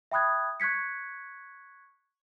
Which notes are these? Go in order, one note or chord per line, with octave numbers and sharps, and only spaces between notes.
E5 G5 B5 D#6 F#6 G#6
C#6 F#6 G#6 B6 C#7